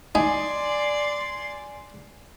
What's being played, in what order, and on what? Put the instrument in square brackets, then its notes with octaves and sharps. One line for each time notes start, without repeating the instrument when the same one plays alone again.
[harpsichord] D#4 [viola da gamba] D5 [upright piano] G#5 [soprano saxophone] C6